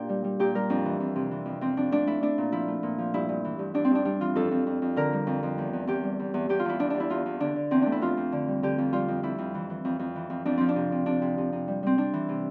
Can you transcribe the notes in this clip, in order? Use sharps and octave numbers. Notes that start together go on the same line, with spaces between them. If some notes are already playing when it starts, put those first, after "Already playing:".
Already playing: A#2 D4 G4
G3
G3
A#2 G4
G3 A#4
F2 D4
E3
F2
C3
E3
F2
F2 C4
F2 D4
A3 D4
A3 E4
A3 D4
A#2
F3 E4
A3
A#2
F3
G2 E4
G2
E3
G2
G2 D4
C4
G2 D4
G3 D4
E3 F4
F2 A4
F2
F2
F2
D3 A#4
G3
F2
F2
E2
E2
E2 G4
G3
E2
E2
E2 G4
F4
E2 E4
E2 D4
E2 D4
E4
E2 F4
E2
D3 D4
D3
E2 C4
A3 D4
E4
F2 F4
F2
D3
G3
D3 G4
F2
G3 F4
F2
F2 E4
F2
E3
E3
F2
F2
E3
F2
F2 D4
F3 C4
D4
C3
C3
C3 D4
C3
C3
C3
G3
G3 C4
G3 D4
E3
C3